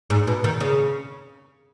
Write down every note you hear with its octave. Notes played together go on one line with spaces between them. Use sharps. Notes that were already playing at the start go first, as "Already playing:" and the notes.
G#2
B2
D#3
C#3